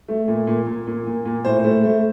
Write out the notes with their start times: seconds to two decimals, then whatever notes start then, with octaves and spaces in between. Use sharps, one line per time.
0.08 A3
0.28 A#2
0.47 A#2
0.67 A#2
0.87 A#2
1.07 A#2
1.25 A#2
1.45 A2 C5
1.65 A3
1.84 A3